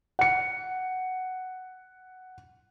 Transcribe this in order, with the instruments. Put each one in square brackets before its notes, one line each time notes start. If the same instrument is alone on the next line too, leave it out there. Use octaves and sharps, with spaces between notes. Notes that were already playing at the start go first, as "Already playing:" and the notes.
[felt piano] F#5 C#7